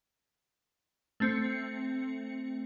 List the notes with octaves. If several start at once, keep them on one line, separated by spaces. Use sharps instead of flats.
A3 C4 C#7